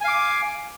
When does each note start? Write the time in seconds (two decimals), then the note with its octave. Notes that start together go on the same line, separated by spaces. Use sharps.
0.01 G#5
0.04 F5
0.08 D6